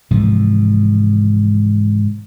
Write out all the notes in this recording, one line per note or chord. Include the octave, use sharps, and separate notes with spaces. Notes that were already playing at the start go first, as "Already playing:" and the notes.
G#2 C3 E3 F3